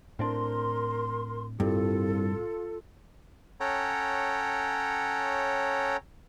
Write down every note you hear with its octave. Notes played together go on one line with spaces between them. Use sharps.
A2 C4 D4 A#4 C6
C2 G2 F4 A4
C#4 A4 C#5 F#5 G5 A#5